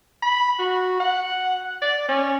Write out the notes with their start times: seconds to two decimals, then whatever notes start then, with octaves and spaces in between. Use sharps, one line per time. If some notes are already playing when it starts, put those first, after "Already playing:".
0.23 B5
0.59 F#4
1.00 F#5
1.82 D5
2.09 C#4